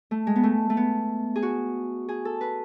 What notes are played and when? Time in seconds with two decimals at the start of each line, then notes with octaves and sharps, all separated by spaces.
0.11 A3
0.27 G#3
0.36 B3
0.43 A3
0.70 A3
0.77 B3
1.36 G#4
1.43 F#4
2.09 G#4
2.25 A4
2.41 B4